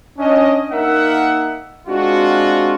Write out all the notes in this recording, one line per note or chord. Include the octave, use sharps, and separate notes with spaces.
C#4 D4 D#5
A#3 D#4 A#4 E5 F#5
G#3 C4 D4 F4 F#4